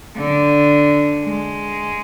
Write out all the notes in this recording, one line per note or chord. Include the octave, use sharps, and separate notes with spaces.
D3
G#3